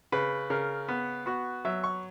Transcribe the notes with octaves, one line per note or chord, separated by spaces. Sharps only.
C#3 B4
C#3 A#4
B3
B3 F#4
F#3 E5
C#6